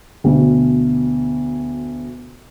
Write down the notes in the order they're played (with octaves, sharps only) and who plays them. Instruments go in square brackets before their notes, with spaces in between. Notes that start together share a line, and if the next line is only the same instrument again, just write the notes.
[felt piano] D2 B2